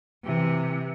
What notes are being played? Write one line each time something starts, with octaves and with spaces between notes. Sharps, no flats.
C3 E3